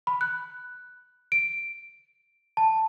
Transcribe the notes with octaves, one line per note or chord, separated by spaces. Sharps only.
B5
F#6
D7
A5